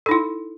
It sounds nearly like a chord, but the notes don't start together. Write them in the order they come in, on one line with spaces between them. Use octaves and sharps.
A4 D#4 E4